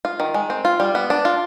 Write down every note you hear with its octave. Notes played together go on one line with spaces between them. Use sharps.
F4
D#3
G#3
C4
F4
G3
B3
D4
F4